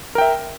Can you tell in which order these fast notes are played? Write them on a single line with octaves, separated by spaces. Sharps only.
A#4 G5 E5